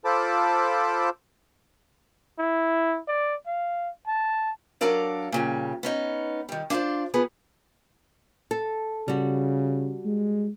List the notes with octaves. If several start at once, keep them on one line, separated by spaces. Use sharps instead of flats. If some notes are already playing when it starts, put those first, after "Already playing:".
F4 A4 C5 A5 B5 D6
E4
D5
F5
A5
F#3 D4 A4 A#4 D5 F5
A#2 C#3 G3
B3 C#4 D#4
D#3 G3
D4 F4 F#4 C5 D5
E2 F3 B3 G#4
A4
C#3 G3 F#4
G#3